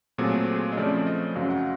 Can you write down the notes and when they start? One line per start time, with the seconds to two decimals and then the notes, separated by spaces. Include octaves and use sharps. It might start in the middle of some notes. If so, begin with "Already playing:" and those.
0.18 A#2 F#3 A3 C4 G#4
0.48 G#4
0.72 D#5
0.77 C#3 F3 A3 C4 D5
1.06 D#5
1.35 F#2 C#3 F#3 F5
1.50 F#5